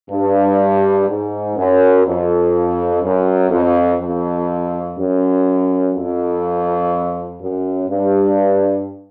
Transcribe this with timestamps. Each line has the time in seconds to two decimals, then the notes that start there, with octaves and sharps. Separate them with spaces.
0.10 G2
1.07 G#2
1.57 F#2
2.05 F2
3.02 F#2
3.50 F2
4.00 F2
4.97 F#2
5.94 F2
7.40 F#2
7.88 G2